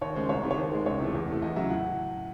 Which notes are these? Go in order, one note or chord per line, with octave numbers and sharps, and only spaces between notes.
D#2 C#5
C#3 G#3 C5
C2 C#5
C3 D#3
C#5
D#2 C5
D#3 G#3
C#2 C#5
C3 E3 A3
E2
C3 E3 A3
E2 D#5
C#3 F#3 E5
A2 F#5